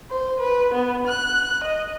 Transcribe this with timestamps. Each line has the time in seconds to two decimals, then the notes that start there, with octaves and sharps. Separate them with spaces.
0.10 C5
0.40 B4
0.74 B3
1.07 F#6
1.64 D#5